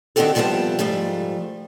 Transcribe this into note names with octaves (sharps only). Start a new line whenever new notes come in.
D#3 C4 D4 F#4 G4 A4
C3 F3 G3 B3 C5 A5
G#2 F3 G3 A3